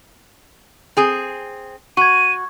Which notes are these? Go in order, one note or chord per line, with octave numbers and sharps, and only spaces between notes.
C4 G#4
F#4 C#6 G#6 D#7